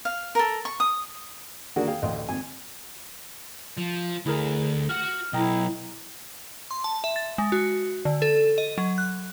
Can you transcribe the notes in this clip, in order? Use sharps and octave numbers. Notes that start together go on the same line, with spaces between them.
F5
A4 A#4
C#6
D#6
D3 D#3 A#3 F#4 G#4 D5
G#4 F5 G5
A1 D2 D#5 F5 G5 C6
G#1 C4 G#5
F3
D2 E4 G#4 A#4
F#4 F#5 F6
B1 E4 D#5 G5 A#5
C6
A5
E5
A6
G#3
F#4
D3
A4
D#5
F#3
F#6